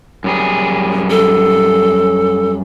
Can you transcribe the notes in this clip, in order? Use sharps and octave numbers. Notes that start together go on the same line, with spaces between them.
F#2 G3 G#4
A4